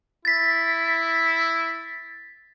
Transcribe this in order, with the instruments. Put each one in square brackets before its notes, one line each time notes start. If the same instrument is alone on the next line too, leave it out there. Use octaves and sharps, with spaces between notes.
[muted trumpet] E4 [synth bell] A6 B6